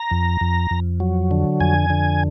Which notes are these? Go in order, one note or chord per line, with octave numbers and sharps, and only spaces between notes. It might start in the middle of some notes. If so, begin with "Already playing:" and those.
Already playing: A#5
F2
F2
F2
F#3
D3
F2 G#5
D3